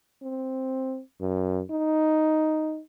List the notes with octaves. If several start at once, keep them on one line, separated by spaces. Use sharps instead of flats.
C4
F#2
D#4